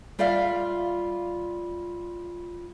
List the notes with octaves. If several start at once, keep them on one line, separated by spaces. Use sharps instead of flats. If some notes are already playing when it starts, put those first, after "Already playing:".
G3 F4 D5 E5 F5